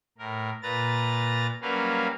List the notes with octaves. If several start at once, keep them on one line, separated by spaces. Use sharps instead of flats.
A2 A#4
A#2 B4 A#5 A6
F#3 G3 A#3 C#4 B4 F5